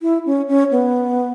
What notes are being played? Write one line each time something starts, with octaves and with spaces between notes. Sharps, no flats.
E4
C#4
C#4
B3